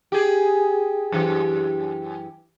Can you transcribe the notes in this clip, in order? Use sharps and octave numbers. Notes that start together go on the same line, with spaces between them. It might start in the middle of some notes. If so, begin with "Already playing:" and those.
G4 G#4
F#2 E3 G4